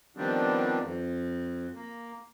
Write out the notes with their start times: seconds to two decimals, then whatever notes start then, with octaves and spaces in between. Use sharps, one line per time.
0.17 D#3 F3 G3 B3 C4 D4
0.80 F2
1.76 A#3